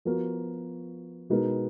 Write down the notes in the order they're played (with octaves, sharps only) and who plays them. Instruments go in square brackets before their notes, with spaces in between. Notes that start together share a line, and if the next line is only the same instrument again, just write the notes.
[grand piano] F3 B3 F#4 A#4
B2 G#3 B3 D#4 A#4